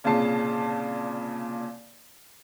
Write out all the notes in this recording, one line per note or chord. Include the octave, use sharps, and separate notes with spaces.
C2 A#2 C#3 A5 C7